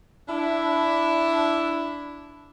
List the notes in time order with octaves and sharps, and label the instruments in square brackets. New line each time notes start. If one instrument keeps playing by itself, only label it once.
[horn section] D4 E4